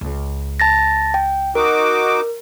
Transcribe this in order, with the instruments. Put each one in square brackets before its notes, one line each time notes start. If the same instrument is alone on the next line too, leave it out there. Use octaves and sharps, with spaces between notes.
[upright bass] C#2
[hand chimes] A5 A6 A#6
G5
[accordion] D#4 F#4 D6 [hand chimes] A#4